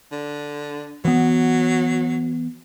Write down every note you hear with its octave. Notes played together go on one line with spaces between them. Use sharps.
D3
E3 F#3 B3